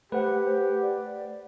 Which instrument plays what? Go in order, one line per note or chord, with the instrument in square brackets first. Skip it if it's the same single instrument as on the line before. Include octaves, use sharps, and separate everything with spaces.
[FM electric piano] A3 F#5 [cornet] G4 [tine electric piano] B4 [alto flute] C5
[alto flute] D5